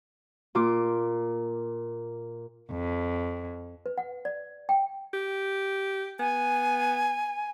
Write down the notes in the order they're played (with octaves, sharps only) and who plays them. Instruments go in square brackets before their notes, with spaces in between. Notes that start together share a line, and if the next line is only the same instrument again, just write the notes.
[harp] A#2 F4 D6
[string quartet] F2
[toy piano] B4
F#5
D5
G5
[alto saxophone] G4
[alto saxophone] B3 [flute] G#5